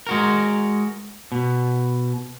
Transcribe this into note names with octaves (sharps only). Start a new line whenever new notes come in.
G#3 F#4 A#4
B2